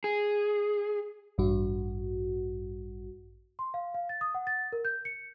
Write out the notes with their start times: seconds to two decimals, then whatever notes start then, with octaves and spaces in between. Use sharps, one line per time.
0.04 G#4
1.38 A1 G2 F#4
3.59 C6
3.74 F5
3.94 F5
4.09 A6
4.21 D#6
4.35 F#5
4.47 A6
4.72 A#4
4.85 G6
5.05 C#7